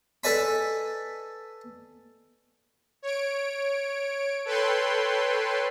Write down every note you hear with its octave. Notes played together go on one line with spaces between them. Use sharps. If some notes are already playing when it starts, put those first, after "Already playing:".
A4 B4 D5 D#5 G#5 B5
C#5 D7
A4 B4 C#5 G5 C6